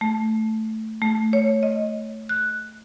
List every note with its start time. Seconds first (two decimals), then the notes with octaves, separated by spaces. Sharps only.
0.01 A3
1.02 A3
1.33 C#5
1.63 D#5
2.29 F#6